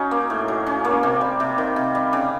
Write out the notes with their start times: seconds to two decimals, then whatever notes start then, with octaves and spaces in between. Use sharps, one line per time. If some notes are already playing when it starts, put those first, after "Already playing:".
Already playing: F#3 C#4 D#4
0.11 A#3
0.30 A2
0.48 F#3
0.67 C#4
0.85 A#3
1.03 C3
1.21 G3
1.40 C3
1.58 D#3
1.76 C3
1.95 G3
2.13 C#3